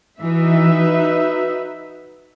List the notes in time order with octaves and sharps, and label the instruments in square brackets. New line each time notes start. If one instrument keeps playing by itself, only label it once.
[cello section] E3 [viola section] D#4 F#4 B4 E5